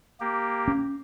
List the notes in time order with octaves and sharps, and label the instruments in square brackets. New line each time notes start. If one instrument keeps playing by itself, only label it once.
[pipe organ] A#3 G4
[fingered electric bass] C#4